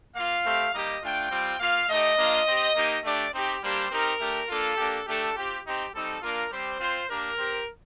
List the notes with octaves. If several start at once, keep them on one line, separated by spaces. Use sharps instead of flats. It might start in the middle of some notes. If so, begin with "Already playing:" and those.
A#3 F4 F5
A3 C4 G4
G3 A#3 D#4 G4 D#5
A3 D4 F4 G5
G3 C4 F4
A#3 F4 F5
A3 D#4 G4 D#5
A#3 D4 F4
C4 G4
A#3 D#4 G4
A3 D4 G4 D5
C4 D#4 G4
G3 A#3 D4 G4 C5
C4 D#4 G4 A#4
A3 D4 G4
A#3 D4 F4 A4
A#3 D4 G4
A3 D4 G4 A4
C4 F4 G4
C4 D#4 G4
G3 C4 D#4 A4
A#3 D4 F4 A#4
G3 C4 G4 C5
C4 F4 C5
A#3 D4 G4 A#4
C4 G4